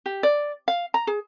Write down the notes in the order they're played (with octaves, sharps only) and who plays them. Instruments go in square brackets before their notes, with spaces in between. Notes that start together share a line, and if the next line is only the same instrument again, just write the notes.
[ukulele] G4
D5
F5
A#5
G#4